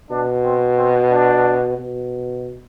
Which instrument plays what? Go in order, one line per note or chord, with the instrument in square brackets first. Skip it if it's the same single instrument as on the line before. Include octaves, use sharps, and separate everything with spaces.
[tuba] B2 [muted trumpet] D4
[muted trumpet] C4
C4
D4
[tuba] B2